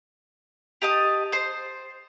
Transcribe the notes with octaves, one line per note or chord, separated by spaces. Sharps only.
G4 D#5 A5 D#6
C5 G6